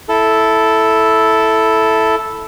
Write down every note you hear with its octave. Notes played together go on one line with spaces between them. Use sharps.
E4 A4